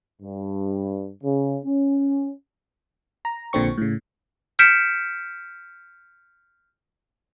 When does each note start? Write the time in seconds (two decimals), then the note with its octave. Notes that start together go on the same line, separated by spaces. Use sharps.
0.22 G2
1.23 C#3
1.65 C#4
3.25 A#5
3.53 A#1 A#2 D3 C4 C#6
3.78 A2 C#3
4.59 F6 G6 B6 C#7 D7 E7